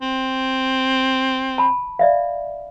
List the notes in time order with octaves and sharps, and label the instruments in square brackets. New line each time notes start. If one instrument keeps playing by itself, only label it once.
[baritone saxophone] C4
[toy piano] A5 B5
D5 E5 F5